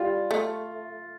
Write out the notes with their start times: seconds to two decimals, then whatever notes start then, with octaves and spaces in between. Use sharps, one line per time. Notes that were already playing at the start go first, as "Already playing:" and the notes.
Already playing: G3 F4
0.31 A3